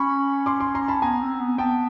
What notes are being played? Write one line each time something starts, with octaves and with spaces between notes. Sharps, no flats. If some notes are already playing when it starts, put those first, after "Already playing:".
Already playing: C#4 B5 C#6
C6 D6
C6 D6
A#5 C6
A5 B5
B3 G#5 A#5
C4
B3
B3 G5 A5